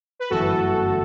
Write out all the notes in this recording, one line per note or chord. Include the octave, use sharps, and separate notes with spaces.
B4
G1 F#2 E3 A3 F#4 A4